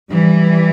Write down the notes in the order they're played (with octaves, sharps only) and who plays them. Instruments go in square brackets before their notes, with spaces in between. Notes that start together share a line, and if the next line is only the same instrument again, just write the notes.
[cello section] E3 G3